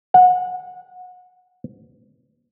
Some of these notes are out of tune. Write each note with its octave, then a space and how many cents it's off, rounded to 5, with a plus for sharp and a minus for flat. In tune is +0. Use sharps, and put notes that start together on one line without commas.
F#5 -25